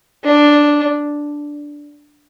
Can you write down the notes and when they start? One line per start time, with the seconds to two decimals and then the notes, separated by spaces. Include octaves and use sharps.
0.24 D4